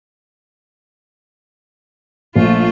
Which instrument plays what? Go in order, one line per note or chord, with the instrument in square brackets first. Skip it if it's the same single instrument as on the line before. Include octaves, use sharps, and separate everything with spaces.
[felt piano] A#1 [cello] A3 F4